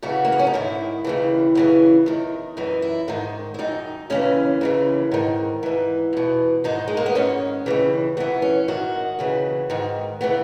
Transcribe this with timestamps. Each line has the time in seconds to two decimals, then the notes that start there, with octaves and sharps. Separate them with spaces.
0.03 F#2 C#3 E3 F#4
0.25 A#3
0.32 B3
0.39 C#4
0.47 D#4
0.54 G#2 D#3 E4
1.04 D#2 C#3 E3
1.55 F#2 C#3 E3
2.06 E2 D#3
2.57 F#2 E3 D#4
2.82 E4
3.08 G#2 D#3 D#4
3.54 E4
3.59 F#2 D#3 D#4
4.10 D#2 C#3 E3 C#4
4.61 D#2 C#3 E3
5.12 G#2 D#3
5.63 G#2 E3
6.13 E2 B2
6.64 G#2 D#3 D#4
6.88 G#3
6.97 A#3
7.06 B3
7.15 G#2 D#3 C#4
7.66 D#2 C#3 E3
8.17 F#2 E3 B3
8.42 C#4
8.68 G#2 D#3 F#4
9.19 D#2 C#3 E3
9.70 G#2 D#3
10.21 C#3 E3 B3